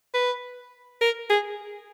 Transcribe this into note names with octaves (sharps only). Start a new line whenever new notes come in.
B4
A#4
G#4